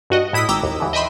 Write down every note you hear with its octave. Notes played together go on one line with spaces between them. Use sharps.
G2 F#4 D#5
A2 E4 D#6 B6
G#1 G5 A#5 D6 E6
D#2
D3 E3
D#5 E5 G5 B5 C6